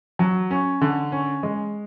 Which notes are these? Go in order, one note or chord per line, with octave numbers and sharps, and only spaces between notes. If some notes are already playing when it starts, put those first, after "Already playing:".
F#3
C#4
D3
C#4
G#3